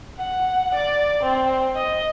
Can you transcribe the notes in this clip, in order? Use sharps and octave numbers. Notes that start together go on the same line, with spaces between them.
F#5
D5
C4
D#5